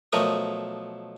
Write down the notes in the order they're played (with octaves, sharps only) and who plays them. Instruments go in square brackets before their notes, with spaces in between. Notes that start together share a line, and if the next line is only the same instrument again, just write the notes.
[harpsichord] B1 F3 A3 A#4 C#6 D#6